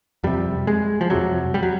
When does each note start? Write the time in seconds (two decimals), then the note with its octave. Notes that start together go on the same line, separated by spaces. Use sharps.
0.24 F2 C3 G3
0.67 G#3
1.01 F3
1.10 F2 C3 F#3
1.54 G3
1.63 F#3